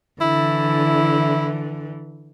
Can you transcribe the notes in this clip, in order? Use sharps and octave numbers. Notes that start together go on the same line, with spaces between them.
D3 E3 E4